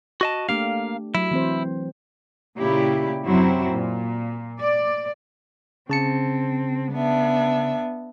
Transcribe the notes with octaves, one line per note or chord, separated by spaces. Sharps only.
F#4 D#5 A5
A3 A#3 D4 G4 F5
F#3 E4
E3 C4 C5
A#2 C#3 E4 G4
F#2 C3 F#3 C4 E4
A#2
D5
C#3 C4 A5 C#7
B3 D4 E5